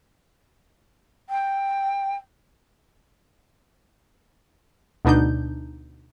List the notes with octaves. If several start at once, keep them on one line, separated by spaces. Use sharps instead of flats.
G5
D2 B2 D4 D#4 G6